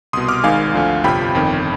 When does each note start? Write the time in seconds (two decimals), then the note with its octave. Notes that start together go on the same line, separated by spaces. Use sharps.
0.13 C2 B2 C6 D#6
0.29 D6 F6
0.44 G#1 G#2 D#3 F5 G#5
0.74 D2 D3 F3
1.04 G1 F2 C3 F3 G5 B5
1.34 G1 F2 D#3